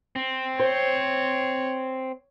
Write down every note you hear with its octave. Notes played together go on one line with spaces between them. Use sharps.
C4
C5 C#5